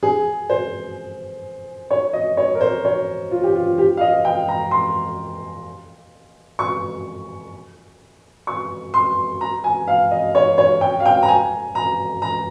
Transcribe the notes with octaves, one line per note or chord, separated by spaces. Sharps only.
G#4
C5
C#5
D#5
C#5
A#4
C5
C#5
F4
G4
F4
G4
F5
D#5
G5
A#5
C6
C#6
C#6
C6
A#5
G#5
F5
D#5
C#5
C#5
G5
F5
G5
A#5
G#5
A#5
A#5